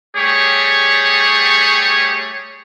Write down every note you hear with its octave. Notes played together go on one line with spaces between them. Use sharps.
G3 A3 G4 G#4 C#5 C#6